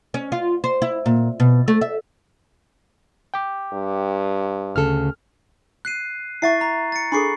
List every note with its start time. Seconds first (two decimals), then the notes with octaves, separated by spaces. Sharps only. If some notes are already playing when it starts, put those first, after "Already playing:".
0.14 C#4
0.32 F4
0.64 C5
0.82 E4
1.06 A#2
1.40 B2
1.68 A3
1.81 E5
3.34 G5 D6
3.73 G2
4.76 D2 C#3 A4 F6
5.85 F#6 C7 D#7
6.42 E4 E5 F#5 C#6 A6 C7
6.61 A#5
6.92 A6 C#7
7.12 D4 G#4 A4 B5 C#6 C7